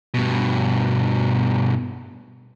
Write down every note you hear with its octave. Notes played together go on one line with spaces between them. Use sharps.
G2 B2